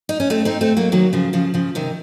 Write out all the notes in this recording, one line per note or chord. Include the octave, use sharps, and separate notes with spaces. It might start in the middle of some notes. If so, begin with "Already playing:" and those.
D#4
C#4
A3 C4
C4 D#4
A3 C4
F#3 A#3
D#3 F#3
C#3 F3
C#3 F3
C#3 F3
C3 D#3